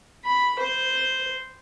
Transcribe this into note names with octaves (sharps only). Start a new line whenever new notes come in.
B5
C5